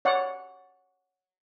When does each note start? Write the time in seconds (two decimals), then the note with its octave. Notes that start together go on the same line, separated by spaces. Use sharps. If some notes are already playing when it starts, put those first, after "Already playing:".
0.05 C#5 D5 F#5